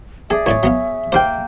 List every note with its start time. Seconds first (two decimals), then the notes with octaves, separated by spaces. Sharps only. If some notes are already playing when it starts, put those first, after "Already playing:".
0.30 G#4 A4 D5 E5
0.46 D#2 A2 C#5 D5
0.63 F#3 B3 F5
1.12 D#2 A#3 C5 F5 G5